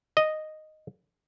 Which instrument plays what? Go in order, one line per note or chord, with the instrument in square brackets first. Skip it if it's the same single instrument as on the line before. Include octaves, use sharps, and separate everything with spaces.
[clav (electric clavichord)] D#5